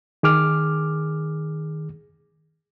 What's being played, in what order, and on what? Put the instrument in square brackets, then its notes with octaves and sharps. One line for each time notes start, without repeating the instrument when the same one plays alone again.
[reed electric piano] D#3 G#4 D6 F6